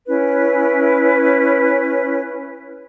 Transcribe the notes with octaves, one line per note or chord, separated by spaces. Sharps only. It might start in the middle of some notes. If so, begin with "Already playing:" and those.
C#4 E4 B4